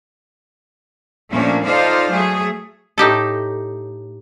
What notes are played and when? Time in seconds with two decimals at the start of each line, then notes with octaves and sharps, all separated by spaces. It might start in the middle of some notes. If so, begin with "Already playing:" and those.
1.31 A#2 F3 A3 A#3 C#4 D4
1.64 D#4 F4 A4 C5 D5 F5
2.12 F#3 A3 G#4
2.98 A2 D#4 G4 A4